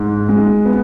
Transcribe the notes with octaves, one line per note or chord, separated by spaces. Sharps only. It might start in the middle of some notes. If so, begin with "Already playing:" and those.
Already playing: G#2
G#3
B3